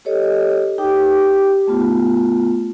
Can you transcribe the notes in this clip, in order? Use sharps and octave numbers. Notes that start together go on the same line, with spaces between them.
G4 A4 C#5 D#5
D#4 G4 G5 D6
A3 B3 F4